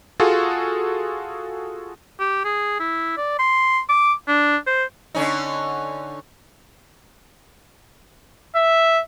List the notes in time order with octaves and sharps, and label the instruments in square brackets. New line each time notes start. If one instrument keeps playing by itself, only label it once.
[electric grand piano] F4 F#4 G#4 A4
[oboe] G4
G#4
E4
D5
C6
D6
D4
C5
[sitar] D3 C#4 D#4
[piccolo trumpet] E5